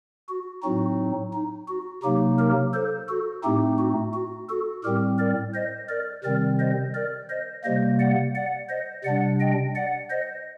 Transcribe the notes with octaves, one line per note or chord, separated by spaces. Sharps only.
F#4
A2 F#3 C4 D#4 F#4
D#4
F#4
C3 F#3 A#3 D#4 G4
G4 A#4
A4 C5
F#4 A4
A2 A3 C4 D#4 G4
F#4
F#4
F#4 A4
A2 G3 C4 G4 A#4
A#4 D5
C5 D#5
A#4 D5
C3 D#3 G3 C4 A#4 D5
C5 D#5
A#4 D5
C5 D#5
C3 G3 A#3 C5 D#5
D5 F#5
D5 F#5
C5 D#5
C3 G3 D4 D5 F#5
D#5 G5
D5 F#5
C5 D#5